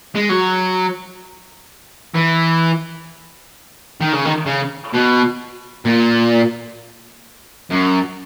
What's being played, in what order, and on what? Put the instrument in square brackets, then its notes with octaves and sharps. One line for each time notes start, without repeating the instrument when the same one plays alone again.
[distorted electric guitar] G#3
F#3
E3
D#3
C#3
D#3
C#3
B2
A#2
F#2